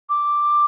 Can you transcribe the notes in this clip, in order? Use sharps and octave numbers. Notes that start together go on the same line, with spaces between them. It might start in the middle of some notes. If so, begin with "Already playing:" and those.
D6